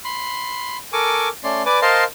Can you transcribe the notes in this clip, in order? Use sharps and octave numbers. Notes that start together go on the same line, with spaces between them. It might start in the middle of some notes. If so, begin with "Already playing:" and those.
B5 C6
A4 A#4 G#5 C#6 D6
A3 C#4 D5 C6
B4 D5 G#5 D6
A#4 C5 D#5 F5 A5 C6